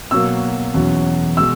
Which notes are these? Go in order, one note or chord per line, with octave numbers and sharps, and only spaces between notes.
B2 F#3 A#3 E6
E2 B2 F#3 C#4
B2 G#3 E6